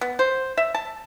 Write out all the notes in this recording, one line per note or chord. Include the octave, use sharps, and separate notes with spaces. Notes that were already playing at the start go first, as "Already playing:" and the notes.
B3
C5
E5
A5